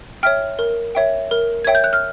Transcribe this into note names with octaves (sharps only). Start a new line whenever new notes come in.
C#5 E5 G5 F6
A#4
C#5 E5 G5
A#4
C#5 E5 G5 G#6
G6
F#6
F6